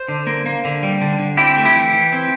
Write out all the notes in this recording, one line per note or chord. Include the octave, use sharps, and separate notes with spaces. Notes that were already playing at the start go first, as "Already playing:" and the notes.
Already playing: C5
D3
A#3
A#3
D3
G3
D3
D3
C4 E4 G4
A3
E4 G4
E3
E3
C4